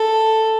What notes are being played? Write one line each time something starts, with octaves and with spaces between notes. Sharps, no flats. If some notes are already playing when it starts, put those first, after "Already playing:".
Already playing: A4